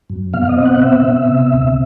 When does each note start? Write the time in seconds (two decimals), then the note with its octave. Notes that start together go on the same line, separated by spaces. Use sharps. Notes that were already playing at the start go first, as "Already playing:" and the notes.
0.10 F#2
0.33 B2 F5
0.49 D#5
0.57 C4
0.65 F#5
0.81 B2 E5
1.04 B2
1.29 C3
1.53 D2